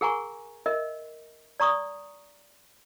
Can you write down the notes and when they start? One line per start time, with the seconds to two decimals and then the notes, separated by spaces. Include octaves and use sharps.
0.01 G#4 A#4 F#5 G#5 A#5 C#6
0.66 A#4 D#5 E5
1.60 D5 A#5 C#6 D#6